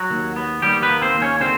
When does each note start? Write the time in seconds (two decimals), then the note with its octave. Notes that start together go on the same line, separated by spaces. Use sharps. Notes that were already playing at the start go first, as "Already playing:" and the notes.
Already playing: F#3 F#4
0.10 D#2
0.36 B3
0.62 D#2 G3 G4
0.82 B3 B4
0.89 A#3
1.02 C4 C5
1.14 D#2
1.22 C#4 C#5
1.40 D3 C4 C5